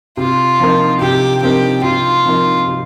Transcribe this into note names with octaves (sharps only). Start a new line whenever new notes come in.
C3 F4
F3 C4 D#4 A#4
C3 G4
F3 C4 D#4 G4 A#4
C3 F4
F3 C4 D#4 A#4
C3